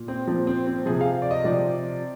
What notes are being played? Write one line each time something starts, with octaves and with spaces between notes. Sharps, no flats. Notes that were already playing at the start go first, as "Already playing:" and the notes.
Already playing: A#2
C4
A#2 F3 C4
C4
C4
C3 F3 G#4
F5
D5
D#5
C3 F3 D5